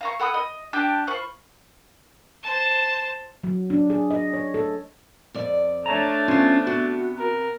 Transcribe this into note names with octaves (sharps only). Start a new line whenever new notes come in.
F5 A#5 C#6
A4 F#5 B5 D#6
D#5
D4 G4 G5 A5
F4 C5 B5 C#6
C5 A5
F#3
D4
G#4
D#5
C#5
A4
F2 D5
A3 D4 C#5 A5 A#5
F3 B3 C#4 F4
C3 B3 F#4
A#4